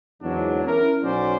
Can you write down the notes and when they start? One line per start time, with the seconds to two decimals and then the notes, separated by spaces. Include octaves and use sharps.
0.23 E2 G#2 F#3 D4
0.67 C#4 E4 A#4
1.03 B1 F#3 C#4 C5 D5